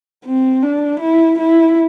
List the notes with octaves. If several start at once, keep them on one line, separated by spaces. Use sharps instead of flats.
C4
D4
E4
E4